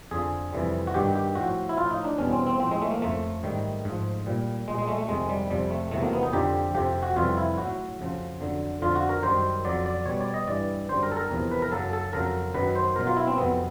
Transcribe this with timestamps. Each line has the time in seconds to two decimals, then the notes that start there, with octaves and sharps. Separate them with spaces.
0.11 F2 D3 F3 G#4
0.53 F2 C3 E3 G3
0.87 F#4
0.94 G2 D#3 G3 G4
1.15 G4
1.35 A2 F3 F#4
1.69 E4
1.77 A2 F3 F4
1.91 D#4
2.04 D4
2.18 E2 B2 G3 C#4
2.32 C4
2.47 C4
2.60 A2 F3 C4
2.71 G#3
2.82 A3
2.92 A#3
3.02 F2 C#3 F3 A3
3.43 G#2 D#3 G3
3.85 G#2 F3
4.26 A#2 G3
4.68 A#2 G3 G#3
4.78 G#3
4.88 A3
4.98 A3
5.09 F2 C3 D#3 G#3
5.29 G3
5.50 F2 C3 F3 G3
5.71 A3
5.91 E2 C3 D#3 F#3 A3
6.03 A#3
6.13 B3
6.23 D#4
6.33 F2 D3 F3 G4
6.74 F2 C3 F3 G4
7.03 F#4
7.16 F2 C3 E3 G3 F4
7.37 E4
7.57 A2 F#3 F#4
8.00 F2 C#3 F3
8.41 F2 D3 F#3
8.82 F2 D3 F3 F4
8.95 F#4
9.09 A#4
9.23 F#2 D#3 G3 C5
9.65 F2 C#3 F#3 D5
9.86 D5
10.06 B2 G3 C#5
10.21 D5
10.34 D#5
10.47 G2 E3 G3 D5
10.89 F#2 D3 G3 C5
11.03 A#4
11.12 A4
11.17 A#4
11.31 E2 C3 F3
11.51 B4
11.62 A#4
11.72 F#2 C#3 F#3 A4
11.93 A4
12.13 F2 C#3 F#3 A#4
12.54 F#2 D#3 F#3 B4
12.75 C5
12.96 B2 F#3 A#4
13.07 F4
13.17 E4
13.27 C4
13.37 F2 C3 D#3 F#3 B3